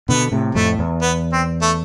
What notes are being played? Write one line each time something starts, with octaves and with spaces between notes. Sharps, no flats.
B2 D3 B3
A2 C3
F2 A2 A3
E2
B3
C4
A3